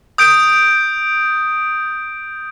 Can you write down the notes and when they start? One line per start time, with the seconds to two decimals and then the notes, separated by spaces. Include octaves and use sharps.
0.18 D#6 G6 D7